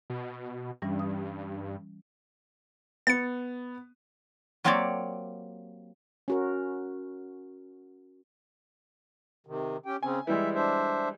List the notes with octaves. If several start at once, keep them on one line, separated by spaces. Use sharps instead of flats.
B2
G2 E3 G3 C#4
D#6
B3 A6 C#7
F#3 A#3 C4 G4 C#5 D5
C#4 F#4 A#4
C3 D#3
C#4 G4 G5
C#3 C4 C#4 G#5
E3 G3 G#3 E5
D4 C5 E5